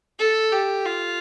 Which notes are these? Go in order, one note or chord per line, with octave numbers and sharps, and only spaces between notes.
A4
G4
F4